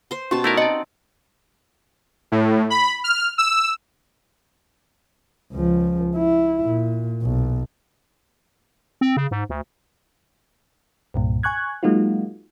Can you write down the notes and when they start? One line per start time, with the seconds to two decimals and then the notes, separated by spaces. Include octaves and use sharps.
0.11 C5 C6
0.31 B2 C#4 F#4 G4 A5
0.44 A3 D#4 E4 A#4 D5
0.57 C4 D5 D#5 F#5 A5
2.32 A2
2.70 B5
3.04 F6
3.38 E6
5.53 C#2 F3
6.17 E4
6.64 A#2
7.22 B1
9.01 C4
9.17 C#3
9.31 G#2
9.50 D2
11.14 C2 G2 A#2
11.43 G#5 C#6 F#6 G#6
11.83 F#3 G#3 A#3 D#4 F4 F#4